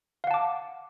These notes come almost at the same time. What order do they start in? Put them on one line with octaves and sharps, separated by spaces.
F5 F#5 A5 D6